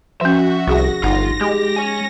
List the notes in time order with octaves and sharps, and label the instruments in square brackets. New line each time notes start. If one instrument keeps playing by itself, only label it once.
[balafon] F3 C#4 [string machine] F#4 [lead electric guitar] E5
[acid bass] C2 [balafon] F#4 G#4 F#5 [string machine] A#6
[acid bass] G1 [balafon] D#4 F#5 [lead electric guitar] F4
[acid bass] G#3 [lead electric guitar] G4
[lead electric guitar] C#5 G#5